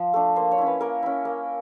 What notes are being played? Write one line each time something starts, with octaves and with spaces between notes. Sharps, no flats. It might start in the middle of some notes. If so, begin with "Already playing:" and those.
Already playing: F3 C5
A3 D4
A#3 C5
C#5
C#4 E4
B4
A#3 A#4
C#4 E4
A#3